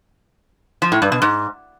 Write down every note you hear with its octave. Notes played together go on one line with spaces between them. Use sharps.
F3
A2
G2
B2
G#2